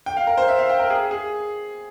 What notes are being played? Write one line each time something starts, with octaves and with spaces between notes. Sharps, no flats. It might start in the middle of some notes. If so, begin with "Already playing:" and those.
G5
F5
A#4
C5
E5
F5
G5
A#4
G#4
G#4